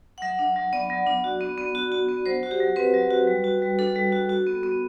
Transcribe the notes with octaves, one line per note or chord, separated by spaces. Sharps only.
F#5
F#3 E5
D4
F#3
B3 D5
F#3
D4
F#4
B3
B3
F#4
F#4
B3
F#3 C5
F#4
G4
F#3
C4 B4
F#3
F#4
G3
F#4
G3
D4 A4
G3
F#4
F#4
B3
B3